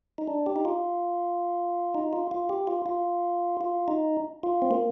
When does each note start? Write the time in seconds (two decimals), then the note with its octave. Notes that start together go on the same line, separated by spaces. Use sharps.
0.18 D#4
0.28 D4
0.46 G4
0.56 D#4
0.65 F4
1.95 D#4
2.13 F4
2.31 F4
2.49 G4
2.67 F4
2.86 F4
3.61 F4
3.88 D#4
4.43 F4
4.62 C4
4.71 A#3